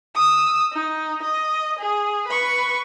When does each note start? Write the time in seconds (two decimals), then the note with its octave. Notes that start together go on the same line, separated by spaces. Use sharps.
0.15 D#6 E6
0.73 D#4
1.23 D#5
1.79 G#4
2.28 B4 C#6